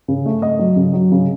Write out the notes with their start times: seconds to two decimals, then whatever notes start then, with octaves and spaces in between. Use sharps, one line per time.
0.08 C#3
0.26 A3
0.42 A3 D#5
0.59 F#3
0.76 C#3
0.93 F#3
1.12 C#3